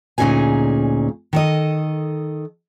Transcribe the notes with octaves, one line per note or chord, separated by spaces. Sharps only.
D2 A#2 C#4 D#4 G#4 G#5
D#3 A4 D#5